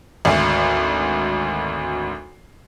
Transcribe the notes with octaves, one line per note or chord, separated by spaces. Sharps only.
G#1 D2